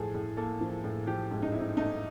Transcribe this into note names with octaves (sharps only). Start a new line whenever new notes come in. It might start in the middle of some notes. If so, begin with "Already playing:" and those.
Already playing: A2 F3 G#4 A4
A2
A#3 A4
F3
A2
F3 G4
G#2
D#4
C4 E4
D#4
A3 D#4